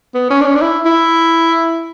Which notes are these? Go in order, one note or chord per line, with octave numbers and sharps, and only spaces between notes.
B3
C#4
D4
C#4
D4
E4
E4